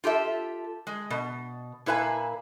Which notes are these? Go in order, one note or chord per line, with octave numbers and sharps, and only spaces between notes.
F4 G4 A4 E5
G#3
B2
A#2 E4 B4 F5 G#5